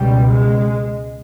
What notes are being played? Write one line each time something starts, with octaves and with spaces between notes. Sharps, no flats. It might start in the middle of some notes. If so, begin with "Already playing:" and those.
Already playing: C#2 B2 G3
G#3